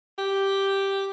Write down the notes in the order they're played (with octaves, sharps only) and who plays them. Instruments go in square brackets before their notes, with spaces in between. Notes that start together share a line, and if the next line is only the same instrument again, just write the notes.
[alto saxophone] G4